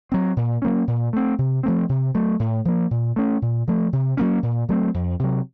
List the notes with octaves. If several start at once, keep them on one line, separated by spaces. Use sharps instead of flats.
F#3 C4
A#2
F#3 A#3 C#4
A#2
A3 C4
C3
F3 A3 C4
C3
F#3 A3
A2
F3 A#3
A#2
A3 C#4
A#2
F3 A3
C3
F#3 A#3 C#4
A#2
F#3 A3 C4
F2
C3 F#3